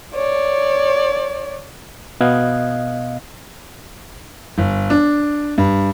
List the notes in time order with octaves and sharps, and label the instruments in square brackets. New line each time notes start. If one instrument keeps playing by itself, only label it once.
[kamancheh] C#5 D5
[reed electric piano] B2 B3 D#5 F5 F#6 G#6
[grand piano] G1
D4
G2